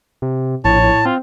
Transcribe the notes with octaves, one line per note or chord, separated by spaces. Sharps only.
C3
A#1 A2 C#5 A5
A2
C4 F4